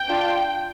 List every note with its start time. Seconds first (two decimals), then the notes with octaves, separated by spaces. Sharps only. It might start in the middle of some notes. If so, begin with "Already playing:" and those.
Already playing: G5
0.08 D4 F4